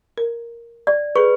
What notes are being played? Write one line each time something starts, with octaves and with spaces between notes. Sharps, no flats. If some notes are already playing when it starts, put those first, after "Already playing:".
A#4
D5
G#4 A4 B4 C#6